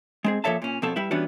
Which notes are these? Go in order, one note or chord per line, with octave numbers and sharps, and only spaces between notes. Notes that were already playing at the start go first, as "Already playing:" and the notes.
G#3 C4 G#4
A#2 F3 A4 C#5 E5 A5
A#2 C#4
F2 B2 C4 A4 C#5
G3 E4 B4 E5
E3 G3 B3 C#4 D4 F#4